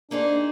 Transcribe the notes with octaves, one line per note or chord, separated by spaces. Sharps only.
A#3 D4 D#4 G#4 C5